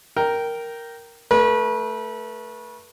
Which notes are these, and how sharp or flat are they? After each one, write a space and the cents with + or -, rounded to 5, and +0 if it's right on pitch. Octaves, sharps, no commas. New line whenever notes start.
A#4 +0 G5 -10
A3 +0 B4 -30